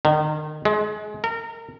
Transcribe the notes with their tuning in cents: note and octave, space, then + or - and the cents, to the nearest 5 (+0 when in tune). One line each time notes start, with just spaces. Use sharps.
D#3 -30
G#3 +25
A#4 -30